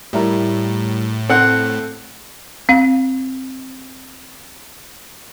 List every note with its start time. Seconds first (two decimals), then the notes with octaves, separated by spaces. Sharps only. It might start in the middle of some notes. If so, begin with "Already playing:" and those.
0.13 A2 G3 E4 A#4
1.29 C4 A4 F#5
2.69 C4 F5